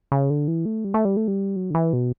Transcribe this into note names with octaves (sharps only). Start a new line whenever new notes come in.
C#3
D3
E3
A3
G3
A3
G3
A3
G3
F#3
D3
E3
B2